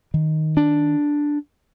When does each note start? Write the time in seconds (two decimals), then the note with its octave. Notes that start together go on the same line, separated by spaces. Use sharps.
0.14 D#3
0.57 D4